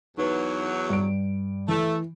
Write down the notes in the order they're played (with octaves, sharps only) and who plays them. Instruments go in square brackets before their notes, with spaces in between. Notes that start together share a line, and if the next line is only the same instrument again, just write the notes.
[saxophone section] E2 F#3 [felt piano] D#4 B4
[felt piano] G2 D7
[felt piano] E3 [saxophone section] A3